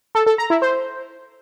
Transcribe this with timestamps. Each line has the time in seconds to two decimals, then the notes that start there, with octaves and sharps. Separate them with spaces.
0.15 A4
0.27 A4
0.38 A#5
0.50 E4
0.62 C5